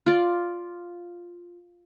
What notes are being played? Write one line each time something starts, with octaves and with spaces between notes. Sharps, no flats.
F4 D5